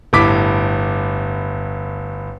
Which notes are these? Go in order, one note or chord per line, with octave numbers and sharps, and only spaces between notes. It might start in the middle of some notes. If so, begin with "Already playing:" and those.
G1 A2 D6 B6